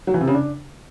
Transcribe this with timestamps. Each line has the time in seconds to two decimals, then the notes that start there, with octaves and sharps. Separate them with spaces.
0.07 F#3
0.14 E3
0.21 C3
0.27 C#3
0.34 D4